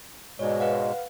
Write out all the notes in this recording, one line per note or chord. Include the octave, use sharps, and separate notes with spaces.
G#2 B2 G#3 C#5 D5
B4 F5 F#5